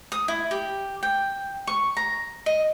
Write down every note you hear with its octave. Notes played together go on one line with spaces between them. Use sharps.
D#6
E4
G4
G5
C#6
A#5
D#5